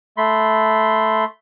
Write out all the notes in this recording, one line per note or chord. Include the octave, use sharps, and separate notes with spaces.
A3 B5 C6